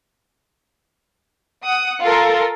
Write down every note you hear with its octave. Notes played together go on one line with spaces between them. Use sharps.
F#5 D#6
F4 A4 A#4